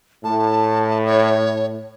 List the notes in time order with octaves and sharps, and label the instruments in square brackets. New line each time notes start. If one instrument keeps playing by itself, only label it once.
[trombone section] A2 [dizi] A5
[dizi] C#5